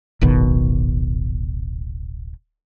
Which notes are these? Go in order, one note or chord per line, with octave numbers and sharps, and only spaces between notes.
D1 G#1 B2 D#3